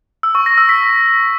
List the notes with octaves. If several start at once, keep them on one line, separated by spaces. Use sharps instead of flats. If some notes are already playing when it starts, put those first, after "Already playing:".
E6
C#6
A#6
E6
B6